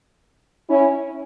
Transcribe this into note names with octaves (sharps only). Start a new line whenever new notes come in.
C#4 E4